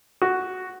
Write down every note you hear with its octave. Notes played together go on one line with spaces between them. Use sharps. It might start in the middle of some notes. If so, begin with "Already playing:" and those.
F#4